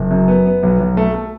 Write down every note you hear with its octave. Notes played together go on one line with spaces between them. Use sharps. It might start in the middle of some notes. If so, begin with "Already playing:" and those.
Already playing: F#1
F#2
B3
B3
B1
B1
A3
A3